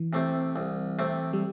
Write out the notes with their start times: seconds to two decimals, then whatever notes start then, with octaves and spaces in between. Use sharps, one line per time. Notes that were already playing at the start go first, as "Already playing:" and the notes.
Already playing: E3
0.13 C3 A3 C4
0.56 C2
0.99 C3 A3 C4
1.33 G3